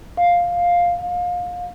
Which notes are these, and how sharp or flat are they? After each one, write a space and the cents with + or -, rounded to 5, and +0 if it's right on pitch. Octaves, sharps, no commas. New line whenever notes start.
F5 +5
F5 +30